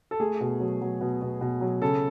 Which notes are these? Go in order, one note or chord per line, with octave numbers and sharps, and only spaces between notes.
A4
A3 G#4
B2
F#3
F#3
B2
B2
B2
F#3
C#3 A4